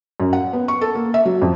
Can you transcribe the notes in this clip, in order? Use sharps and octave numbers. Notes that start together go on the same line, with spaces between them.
F#2
F#5
B3
C#6
A4
A#3
E5
F#3
F2